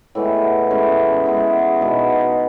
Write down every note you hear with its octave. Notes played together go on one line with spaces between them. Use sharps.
A2 E3 G#3 B3
G#3 C#4 E4 A4
G#3 B3 E4
B2 G#3 D#4